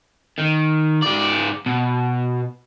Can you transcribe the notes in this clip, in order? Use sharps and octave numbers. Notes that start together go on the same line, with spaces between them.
D#3
G#2 D5
B2